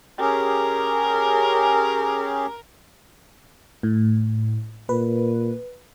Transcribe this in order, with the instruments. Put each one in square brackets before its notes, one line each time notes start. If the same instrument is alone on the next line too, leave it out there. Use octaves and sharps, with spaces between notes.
[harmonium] C#4 G4 G#4 [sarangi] A#4
[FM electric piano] A2
[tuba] A#2 [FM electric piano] B4